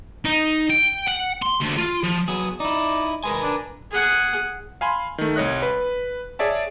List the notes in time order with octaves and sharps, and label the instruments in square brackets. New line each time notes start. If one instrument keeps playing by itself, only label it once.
[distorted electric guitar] D#4
G5
F#5
C6
D2
F4
F3
[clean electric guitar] F#3 B3 G#4
[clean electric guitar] D#4 E4 [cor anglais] D5
[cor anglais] G#3 [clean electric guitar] A#4 B4 G#5
[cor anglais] D4
[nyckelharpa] G#4 F#5
[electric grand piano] F5 G#5 B5 C6
D#3 A3
C2 C#5 D#5 F#6
B4
G#4 C#5 D5 E5 A5